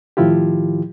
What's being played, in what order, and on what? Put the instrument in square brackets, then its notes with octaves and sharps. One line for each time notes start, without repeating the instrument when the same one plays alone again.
[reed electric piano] A2 D#3 F3 E4 F4 G4